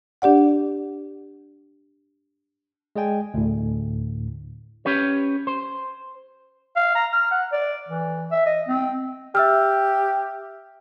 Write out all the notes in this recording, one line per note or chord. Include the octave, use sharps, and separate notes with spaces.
D4 G4 D5 F#5
G#3 G#4 D5 G5 G#5
D2 A2
C#4 G4 B4 C#5
C5
F5
A#5
F6
F#5
D5
E3
E5
D#5
C4
G4 E5 E6 F6